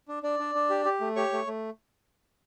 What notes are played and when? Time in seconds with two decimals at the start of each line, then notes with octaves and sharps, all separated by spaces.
0.08 D4
0.23 D4 D5
0.39 D4
0.55 D4
0.70 G4
0.85 G4
1.01 A3
1.16 G4 C#5 C#6
1.32 A3
1.47 A3